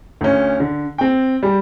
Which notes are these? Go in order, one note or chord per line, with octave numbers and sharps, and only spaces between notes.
D2 C#4
D3
C4 G5
G3 G4